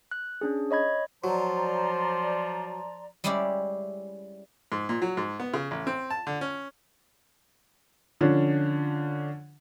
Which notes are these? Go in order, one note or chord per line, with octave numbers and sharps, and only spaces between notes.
F#6
C#4 D4 G#4
C#5 D#5 B5 G#6
F3 F#3 C5 D5 A#5 C6
G3 G#3 C#4 E4 G4 D5
G#2
A#2
F#3
G#2
B3
C#3
A1
C4
A5
D3
C#4
D3 F3 C#4 D4